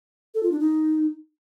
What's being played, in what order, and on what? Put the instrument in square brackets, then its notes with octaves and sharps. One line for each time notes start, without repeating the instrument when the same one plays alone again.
[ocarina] A4
F4
D4
D#4